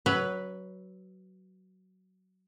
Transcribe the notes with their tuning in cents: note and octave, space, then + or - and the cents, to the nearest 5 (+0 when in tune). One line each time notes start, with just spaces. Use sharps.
F#3 +15 B4 +0